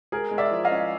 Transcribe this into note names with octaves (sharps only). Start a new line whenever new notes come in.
G#3 G#4 A#4
G#3
D5 E5
F3
D#5 F5
C#4